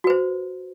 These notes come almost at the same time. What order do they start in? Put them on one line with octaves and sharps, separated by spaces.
F#4 B4 C5